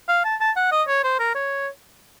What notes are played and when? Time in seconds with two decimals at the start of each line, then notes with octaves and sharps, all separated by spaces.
0.09 F5
0.24 A5
0.40 A5
0.56 F#5
0.72 D#5
0.88 C#5
1.03 C5
1.19 A#4
1.35 C#5